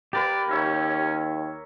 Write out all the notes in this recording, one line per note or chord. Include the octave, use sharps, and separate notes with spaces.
A#3 G4 A#4 B4 D5
D#2 C#4 C#5 E5 A#5